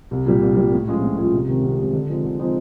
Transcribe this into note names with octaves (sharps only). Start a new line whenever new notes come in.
C2
A#2 G3
C2
A#2 G3
A2
F3 G#3 C#4 F4
A2
F3 G#3 C#4 F4
C2
C3 D#3 G#3 C4
C2
C3 D#3 G#3 C4
D3
F3 G#3 C4 D#4
D3
F3 G#3 C4 D#4